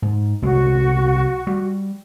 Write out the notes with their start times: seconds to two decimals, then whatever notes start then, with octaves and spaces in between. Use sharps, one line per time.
0.02 G#2
0.42 C2 F#3 G#3 F#4
1.47 G3